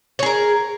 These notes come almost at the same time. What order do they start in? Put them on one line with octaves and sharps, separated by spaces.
C#5 G#4 A#4